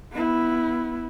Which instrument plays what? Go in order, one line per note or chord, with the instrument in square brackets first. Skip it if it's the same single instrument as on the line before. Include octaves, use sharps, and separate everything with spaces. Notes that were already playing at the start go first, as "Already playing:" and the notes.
[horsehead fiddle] B3 E4